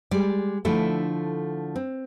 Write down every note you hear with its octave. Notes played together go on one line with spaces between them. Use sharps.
G3 G#3 D5
D3 F3 A3 D4 E4 A4
C4